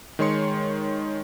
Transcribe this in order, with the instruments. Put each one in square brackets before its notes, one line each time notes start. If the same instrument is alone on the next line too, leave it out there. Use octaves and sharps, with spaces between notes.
[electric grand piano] D#3 G#3 C#5 C6 C#7